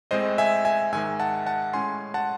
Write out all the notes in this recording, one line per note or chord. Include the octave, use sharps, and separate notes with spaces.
A2 G#3 C4 C5 D#5
E5 G#5
E5 G#5
G#2 D#3 G#3 E5 G#5
F#5 A5
F#5 A5
A2 G#3 C#4 G#5 C6
F#5 A5